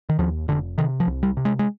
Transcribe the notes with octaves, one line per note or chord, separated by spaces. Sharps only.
D#3
D#2 F3
F1 D3
C3 D#3
F3
C2
G3
C3
G#3
G#3